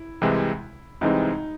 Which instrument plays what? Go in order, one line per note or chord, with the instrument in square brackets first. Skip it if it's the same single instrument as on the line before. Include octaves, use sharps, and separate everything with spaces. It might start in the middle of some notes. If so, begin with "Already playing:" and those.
Already playing: [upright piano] E4
[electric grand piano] C2 C3 E3 G#3 C4
[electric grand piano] C2 C3 E3 G#3 C4 [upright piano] D#4